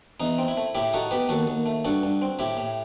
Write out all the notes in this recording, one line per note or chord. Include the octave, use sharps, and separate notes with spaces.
E2 D#4
C4
E4
A3
A2 E4 G4
D#4 F#4 A4
B3 G4 B4
D#2 F#4 A4
D#2
A3
G2 F#4 A4
G2
C4
A2 E4 G4
A2